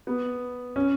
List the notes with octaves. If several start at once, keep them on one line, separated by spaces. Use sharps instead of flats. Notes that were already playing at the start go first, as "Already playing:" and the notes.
B3
C#4